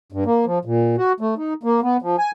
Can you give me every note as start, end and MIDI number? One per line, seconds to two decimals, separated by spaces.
0.12 0.24 43
0.26 0.45 58
0.45 0.59 53
0.65 0.96 46
0.98 1.12 66
1.20 1.34 57
1.38 1.53 63
1.63 1.80 58
1.82 1.97 59
2.02 2.16 53
2.18 2.31 80